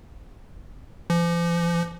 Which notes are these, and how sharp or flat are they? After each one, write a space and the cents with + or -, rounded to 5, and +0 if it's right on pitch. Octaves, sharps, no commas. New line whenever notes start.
F3 -40